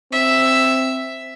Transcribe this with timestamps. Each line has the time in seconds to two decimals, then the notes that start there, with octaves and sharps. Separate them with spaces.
0.12 C4 E5